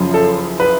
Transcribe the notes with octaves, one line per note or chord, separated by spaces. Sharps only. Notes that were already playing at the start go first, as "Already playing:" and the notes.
Already playing: F#1 F#2 F3
A4
B4